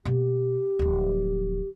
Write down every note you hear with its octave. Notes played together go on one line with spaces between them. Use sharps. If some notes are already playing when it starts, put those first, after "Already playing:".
B2 A#3 G4
D1 F3